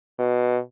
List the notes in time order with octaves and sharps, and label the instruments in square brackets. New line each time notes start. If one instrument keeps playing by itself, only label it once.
[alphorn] B2